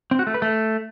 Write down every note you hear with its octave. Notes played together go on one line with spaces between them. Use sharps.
C4
F#4
A3
B4
A3